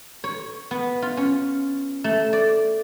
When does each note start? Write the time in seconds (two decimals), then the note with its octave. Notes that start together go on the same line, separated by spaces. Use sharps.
0.24 C#5
0.71 B3
1.02 F4
1.17 C#4
2.04 A3
2.33 D5